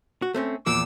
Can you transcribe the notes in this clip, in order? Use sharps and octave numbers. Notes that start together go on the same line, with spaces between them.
F#4
A3 C4 C#4
E2 A#2 F3 D6 E6